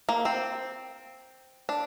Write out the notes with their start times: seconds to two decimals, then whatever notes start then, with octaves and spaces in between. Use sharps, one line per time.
0.09 A#3
0.25 C4
1.69 D4